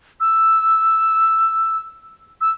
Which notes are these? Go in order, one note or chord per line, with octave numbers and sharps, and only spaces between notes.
E6
E6